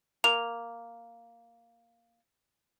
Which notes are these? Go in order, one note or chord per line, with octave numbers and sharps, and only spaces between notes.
A#3 F7